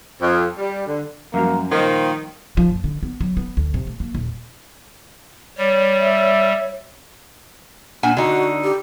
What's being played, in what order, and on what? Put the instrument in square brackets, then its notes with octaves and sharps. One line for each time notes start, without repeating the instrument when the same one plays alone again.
[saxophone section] F2
G3
D3
[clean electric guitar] F#2 [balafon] F3 G3 F#4 [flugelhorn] A#3
[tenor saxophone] D#3 [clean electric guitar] A#3 F4 [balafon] A#4 D#5 [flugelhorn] C5
[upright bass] F3
F#1
D3
B3
F#3
B3
D2
C3
A3
A#3
D#1
[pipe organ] G3 [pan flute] C#5
[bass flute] E5
[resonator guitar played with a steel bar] A#2 F#5 G#5 [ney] D4
[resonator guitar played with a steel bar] D3 D#4 [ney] F#4
[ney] G4